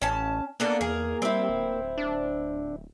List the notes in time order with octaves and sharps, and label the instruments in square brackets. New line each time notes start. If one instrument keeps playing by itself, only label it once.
[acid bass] A1 [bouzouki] C#4 A5
[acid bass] A#3 [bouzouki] B3 D4 A4
[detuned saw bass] E2 [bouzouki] G#4 A#4
[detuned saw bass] G3 [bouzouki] C4 E4
[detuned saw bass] D1
[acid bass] D4